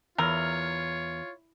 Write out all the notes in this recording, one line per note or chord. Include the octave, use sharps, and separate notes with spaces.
E2 F4 A#4 C#5